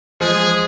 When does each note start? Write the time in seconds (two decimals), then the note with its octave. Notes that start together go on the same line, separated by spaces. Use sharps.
0.21 F3 G#3 G#4